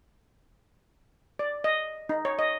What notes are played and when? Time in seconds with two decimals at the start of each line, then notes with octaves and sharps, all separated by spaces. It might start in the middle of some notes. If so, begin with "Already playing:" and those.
1.39 D5
1.64 D#5
2.09 D#4
2.25 C#5
2.39 D#5